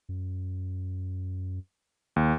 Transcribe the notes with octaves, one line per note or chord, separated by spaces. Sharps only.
F#2
D#2